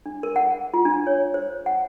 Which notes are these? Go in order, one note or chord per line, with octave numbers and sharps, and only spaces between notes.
D4
A#4
F#5
F4
D4
C#5
C5
F#5